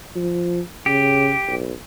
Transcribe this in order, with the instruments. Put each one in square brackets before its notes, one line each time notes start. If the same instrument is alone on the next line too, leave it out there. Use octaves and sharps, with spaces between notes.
[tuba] F3
[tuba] C#3 [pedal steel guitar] G4
[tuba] B1